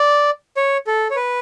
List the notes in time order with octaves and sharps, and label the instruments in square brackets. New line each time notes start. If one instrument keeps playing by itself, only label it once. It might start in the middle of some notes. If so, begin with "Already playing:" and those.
Already playing: [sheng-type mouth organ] D5
C#5
A4
C#5
B4